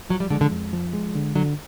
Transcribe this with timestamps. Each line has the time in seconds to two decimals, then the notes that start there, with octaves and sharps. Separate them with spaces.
0.10 F3 F#3
0.20 G3
0.30 D3 G#3
0.41 D3
0.51 F2
0.73 F3
0.93 G#3
1.15 D3
1.35 D3 F#3